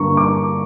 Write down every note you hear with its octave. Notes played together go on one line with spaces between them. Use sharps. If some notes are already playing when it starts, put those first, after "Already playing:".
Already playing: G2 D3 G3 A#3 A#5 C#6
D6